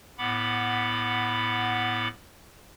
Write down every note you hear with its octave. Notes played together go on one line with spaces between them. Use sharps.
A2 B3 F#5 B5 D6